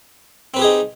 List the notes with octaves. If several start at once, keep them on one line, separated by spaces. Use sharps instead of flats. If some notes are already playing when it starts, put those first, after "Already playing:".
C4 D#4 G4 G#4 B4